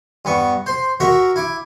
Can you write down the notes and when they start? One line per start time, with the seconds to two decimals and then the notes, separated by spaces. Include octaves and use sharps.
0.25 G2 B3 C#6
0.66 C5 C6
1.00 F#4 A#4 E5 C#6
1.36 E4 D6